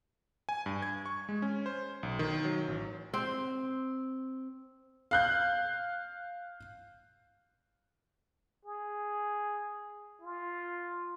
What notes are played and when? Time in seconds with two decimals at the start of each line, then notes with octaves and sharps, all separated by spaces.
0.49 G#5
0.66 G2
0.82 G#6
1.06 C#6
1.29 G#3
1.42 C#4
1.66 C5
2.03 B1
2.19 D#3
2.45 F#3
2.68 A1
3.14 C4
5.11 F5 F#6 G6
8.65 G#4
10.21 F4